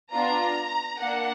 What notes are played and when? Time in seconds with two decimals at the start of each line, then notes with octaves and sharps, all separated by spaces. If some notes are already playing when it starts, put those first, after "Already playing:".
0.12 B3 D4 F4 A#5
1.00 A#3 D4 F#5